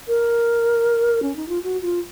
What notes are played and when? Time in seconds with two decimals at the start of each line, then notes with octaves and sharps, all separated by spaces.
0.08 A#4
1.22 C#4
1.36 D#4
1.48 F4
1.63 F#4
1.82 F4